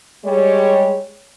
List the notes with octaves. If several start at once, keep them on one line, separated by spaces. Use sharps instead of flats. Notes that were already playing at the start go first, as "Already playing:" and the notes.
G3 G#3 C#5